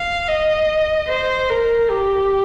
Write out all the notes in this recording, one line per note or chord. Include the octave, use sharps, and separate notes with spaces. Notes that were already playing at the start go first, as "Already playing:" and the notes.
Already playing: F5
D#5
C5
A#4
G4